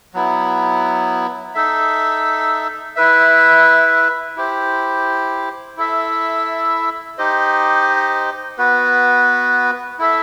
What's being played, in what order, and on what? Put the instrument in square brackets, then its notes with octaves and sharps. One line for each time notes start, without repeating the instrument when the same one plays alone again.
[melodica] F#3 B3 E4
D#4 A4 E5
E4 B4 E5
E4 G4 C5
E4 A4 E5
D#4 G4 C5 D#5
B3 F#4 B4
E4 A4 E5